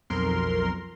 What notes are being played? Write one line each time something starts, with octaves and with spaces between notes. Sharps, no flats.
B1 F2 A#4 C6